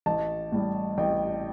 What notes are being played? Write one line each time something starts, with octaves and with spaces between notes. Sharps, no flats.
A1 A5
A2 G3
A1 G5